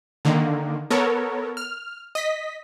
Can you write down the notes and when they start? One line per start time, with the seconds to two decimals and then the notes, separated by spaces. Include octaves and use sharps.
0.25 D3 D#3 A#3
0.91 B3 A4 A#4 C#5
1.57 F6
2.15 D#5 B6